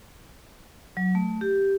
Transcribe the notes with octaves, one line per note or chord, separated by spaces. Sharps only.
F#3
A3
G4